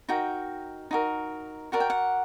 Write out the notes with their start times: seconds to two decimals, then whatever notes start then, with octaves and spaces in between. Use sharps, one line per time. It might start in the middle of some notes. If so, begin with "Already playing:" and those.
0.09 D#4 F#4 A#4 G5
0.91 D#4 F#4 A#4
1.72 F#4 A#4 D5 F#5
1.80 G5
1.90 F#5